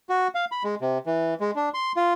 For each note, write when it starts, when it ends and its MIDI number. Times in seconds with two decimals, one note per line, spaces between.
0.09 0.28 66
0.35 0.45 77
0.52 0.63 83
0.64 0.75 56
0.81 0.98 48
1.06 1.34 52
1.40 1.51 56
1.56 1.69 62
1.74 1.92 84
1.97 2.13 65